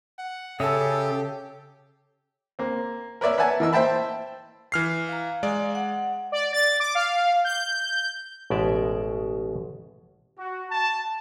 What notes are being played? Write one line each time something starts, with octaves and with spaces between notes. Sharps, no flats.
F#5
C#3 G4 A4 C#5 E5 D#6
A#3 C4
A#4 B4 C#5 D5 E5
B4 E5 F#5 G#5 A5
E3 A#4 D#5 E6
C5 E5 G5 A5 B5
E3 F6 C7
F5 A#5
G#3 D5
F#5
D5
A6
D6
F5
G6
A1 B2 G#3 D5 E5
F#4
A5